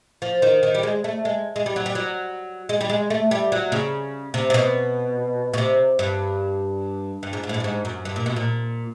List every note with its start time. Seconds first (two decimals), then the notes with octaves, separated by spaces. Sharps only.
0.22 F3
0.42 D#3
0.63 D#3
0.75 G3
0.83 G#3
1.04 A3
1.25 G#3
1.56 G#3
1.66 G3
1.76 F#3
1.86 G3
1.95 F#3
2.69 G#3
2.81 G3
2.90 G#3
3.10 A3
3.31 G3
3.52 F#3
3.72 C#3
4.34 C3
4.50 C3
4.54 B2
5.54 B2
5.58 C3
5.99 G2
7.23 G2
7.33 G#2
7.43 G#2
7.49 A2
7.54 G#2
7.60 G2
7.64 G#2
7.85 F#2
8.05 G2
8.16 A#2
8.26 B2
8.36 A#2